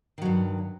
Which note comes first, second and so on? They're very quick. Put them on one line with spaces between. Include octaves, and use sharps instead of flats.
D#3 F#3 G2